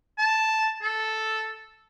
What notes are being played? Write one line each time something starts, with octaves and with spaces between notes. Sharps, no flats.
A5
A4